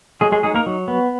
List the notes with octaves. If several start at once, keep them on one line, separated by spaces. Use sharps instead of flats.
F#3 G#3 G#4
G#3 G#4
G#3 D#4 G#4
A#3 A#4
F#3
B3